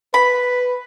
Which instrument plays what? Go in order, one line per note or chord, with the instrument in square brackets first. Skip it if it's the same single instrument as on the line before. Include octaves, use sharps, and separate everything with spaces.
[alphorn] B4 [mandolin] B5